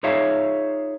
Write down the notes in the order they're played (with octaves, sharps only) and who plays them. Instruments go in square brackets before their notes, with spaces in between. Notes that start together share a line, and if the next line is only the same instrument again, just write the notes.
[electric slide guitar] D#4 F4 G#4 C#5 E5 F5